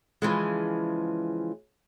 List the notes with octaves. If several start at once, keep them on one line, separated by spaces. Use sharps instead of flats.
C#3 E3 F3 G#3